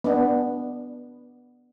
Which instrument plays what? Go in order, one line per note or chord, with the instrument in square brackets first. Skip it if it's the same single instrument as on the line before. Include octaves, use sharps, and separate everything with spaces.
[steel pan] B3 D4